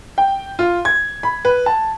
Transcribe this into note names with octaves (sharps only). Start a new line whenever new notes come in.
G5
F4
G#6
B5
B4
A5